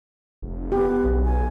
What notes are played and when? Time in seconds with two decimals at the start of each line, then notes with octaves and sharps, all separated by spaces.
0.42 F1
0.72 B3 G4
1.04 B1
1.25 G#5